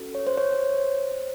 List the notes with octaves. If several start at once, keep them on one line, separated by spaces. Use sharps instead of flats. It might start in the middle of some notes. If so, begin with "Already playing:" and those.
Already playing: C#4 F#4 A4
C#5
C5
C#5
C5